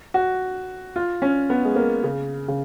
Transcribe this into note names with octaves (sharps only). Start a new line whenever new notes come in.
F#4
F4
C#4
B3
G#3
A#3
C#3
C#3